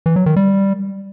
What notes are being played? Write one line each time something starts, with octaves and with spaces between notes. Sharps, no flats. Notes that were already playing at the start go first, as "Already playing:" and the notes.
E3
F#3
D#3
G3